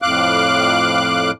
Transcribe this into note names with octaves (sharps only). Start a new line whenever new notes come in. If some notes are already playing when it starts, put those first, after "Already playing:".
F2 A2 F5 D6 F#6